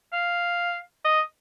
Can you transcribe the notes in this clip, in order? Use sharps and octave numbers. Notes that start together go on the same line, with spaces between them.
F5
D#5